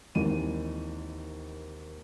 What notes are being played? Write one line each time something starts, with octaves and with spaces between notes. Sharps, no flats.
G#1 D#2 E3 D#4 D#7